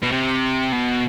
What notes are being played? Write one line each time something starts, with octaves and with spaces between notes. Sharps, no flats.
B2
C3
B2